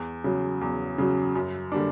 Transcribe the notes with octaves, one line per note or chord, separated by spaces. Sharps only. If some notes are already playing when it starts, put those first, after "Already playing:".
Already playing: E2
C#3 F#3
E2
C#3 F#3
F#2
D3 G3 A#3 D4